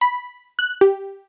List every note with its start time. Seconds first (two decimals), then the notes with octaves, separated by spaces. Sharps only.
0.01 B5
0.59 F#6
0.81 G4